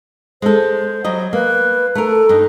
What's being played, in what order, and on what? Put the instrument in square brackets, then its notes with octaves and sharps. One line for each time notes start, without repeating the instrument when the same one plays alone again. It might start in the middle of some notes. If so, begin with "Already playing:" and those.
[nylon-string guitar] G#3 A4 [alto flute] C5
[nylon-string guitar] F#3 G3 D#5
[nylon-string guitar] A#3 [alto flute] B4
[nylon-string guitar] A3 A#4 [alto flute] A4
[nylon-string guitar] G2 D#4